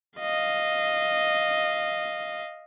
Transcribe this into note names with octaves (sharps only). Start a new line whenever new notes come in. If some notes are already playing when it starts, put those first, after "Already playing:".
D#5 F5